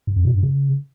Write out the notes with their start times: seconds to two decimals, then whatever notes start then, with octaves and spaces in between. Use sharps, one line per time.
0.07 G#2
0.16 F2
0.25 B2
0.34 G2
0.43 C#3